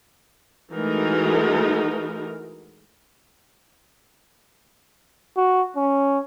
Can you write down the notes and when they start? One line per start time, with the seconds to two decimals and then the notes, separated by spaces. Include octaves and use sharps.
0.73 E3 G#3 A3 D#4 F#4 A#4
5.37 F#4
5.76 C#4